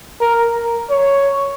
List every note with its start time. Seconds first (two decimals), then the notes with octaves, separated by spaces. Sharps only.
0.20 A#4
0.90 C#5